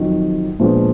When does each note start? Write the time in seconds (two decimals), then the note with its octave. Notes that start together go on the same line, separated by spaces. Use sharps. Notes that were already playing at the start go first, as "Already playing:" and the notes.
Already playing: F2 D#3 F#3
0.59 A#2 F3 G#3 B3 D4